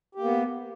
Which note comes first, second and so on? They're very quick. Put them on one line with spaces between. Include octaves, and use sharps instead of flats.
G4 A#3 B3